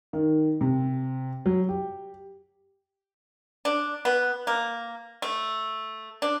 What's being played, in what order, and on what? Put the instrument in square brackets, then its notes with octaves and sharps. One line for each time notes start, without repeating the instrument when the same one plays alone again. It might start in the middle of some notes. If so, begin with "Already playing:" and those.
[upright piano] D#3
C3
F#3
G4
[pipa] D4
B3
A#3
A3
D4